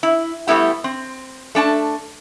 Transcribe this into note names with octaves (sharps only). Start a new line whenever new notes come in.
E4
G3 A3 B3 E4 G4
C4
A3 D4 G#5 A5